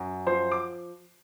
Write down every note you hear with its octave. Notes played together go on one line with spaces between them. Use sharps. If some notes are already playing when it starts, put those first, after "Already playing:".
Already playing: F#2
F3 C5 C6
D6